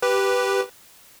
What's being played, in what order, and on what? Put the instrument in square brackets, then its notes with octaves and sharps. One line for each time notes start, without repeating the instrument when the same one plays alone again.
[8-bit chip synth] G4 B4